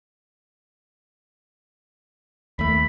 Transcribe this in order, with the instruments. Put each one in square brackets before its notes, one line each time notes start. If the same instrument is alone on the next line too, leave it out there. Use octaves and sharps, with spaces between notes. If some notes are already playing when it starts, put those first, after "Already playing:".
[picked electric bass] D#2 A3 [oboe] B5